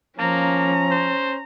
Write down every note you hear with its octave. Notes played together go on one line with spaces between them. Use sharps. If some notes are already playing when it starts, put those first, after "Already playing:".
F3 A#3 C#4 A#5
C5